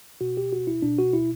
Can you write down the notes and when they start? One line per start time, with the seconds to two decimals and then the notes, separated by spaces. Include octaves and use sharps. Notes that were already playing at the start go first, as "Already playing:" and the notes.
0.21 B2 F#4
0.37 G4
0.52 F#4
0.67 E4
0.82 B2 D4
0.99 F#4
1.13 E4